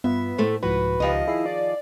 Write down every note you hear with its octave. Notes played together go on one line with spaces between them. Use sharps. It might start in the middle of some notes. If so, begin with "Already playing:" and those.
G2 B3 F4 E5
A2 A3 C5
C2 G#2 F3 F#4 B4
C#2 D#3 F3 G4 D#5
E4 G#4 C7
D5